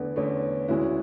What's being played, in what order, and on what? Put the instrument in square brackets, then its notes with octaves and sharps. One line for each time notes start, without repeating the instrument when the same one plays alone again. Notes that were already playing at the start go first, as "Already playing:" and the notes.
Already playing: [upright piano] E2 D3 A3 [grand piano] B3
[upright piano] E2 D3 A3 [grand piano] C#4
[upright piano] D2 C#3 G#3 C#4 F#4 [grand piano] E4